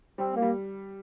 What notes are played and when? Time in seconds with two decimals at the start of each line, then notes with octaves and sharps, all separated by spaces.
0.18 G3 C4
0.36 A#3
0.42 G3